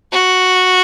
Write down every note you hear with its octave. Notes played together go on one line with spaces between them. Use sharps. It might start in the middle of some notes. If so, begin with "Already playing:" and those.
F#4